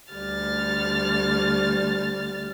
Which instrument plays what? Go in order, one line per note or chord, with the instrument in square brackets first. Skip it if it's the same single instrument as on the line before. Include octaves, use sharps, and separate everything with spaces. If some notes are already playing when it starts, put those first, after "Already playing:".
[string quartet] D2 G3 F6 A6